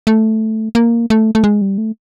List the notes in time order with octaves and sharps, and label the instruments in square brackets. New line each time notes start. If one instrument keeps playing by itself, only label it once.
[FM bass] A3
A#3
A3
A3
G#3
G3
A3